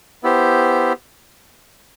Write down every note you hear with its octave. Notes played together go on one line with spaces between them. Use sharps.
B3 E4 G4 C5